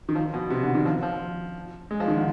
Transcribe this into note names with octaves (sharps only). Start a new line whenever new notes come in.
D#3
F3
B2
C3
D3
D#3
F3
F3
G#3
F3
D#3
D3